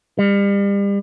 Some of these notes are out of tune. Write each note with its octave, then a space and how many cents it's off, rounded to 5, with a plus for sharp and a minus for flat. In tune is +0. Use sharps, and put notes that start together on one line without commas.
G3 +35